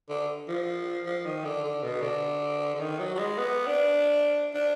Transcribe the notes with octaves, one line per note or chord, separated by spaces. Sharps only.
D3
F3
F3
D#3
D3
D3
B2
D3
D3
D#3
F#3
F#3
G#3
B3
D4
D4